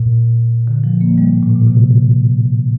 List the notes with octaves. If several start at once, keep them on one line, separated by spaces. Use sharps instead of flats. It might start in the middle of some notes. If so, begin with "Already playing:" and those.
Already playing: A#2
D3
F3
A#3
G3
A2
A#2
A#2
C3